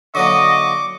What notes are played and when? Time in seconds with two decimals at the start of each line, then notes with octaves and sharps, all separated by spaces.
0.15 D3 F#3 A#3 D#5 C#6 D6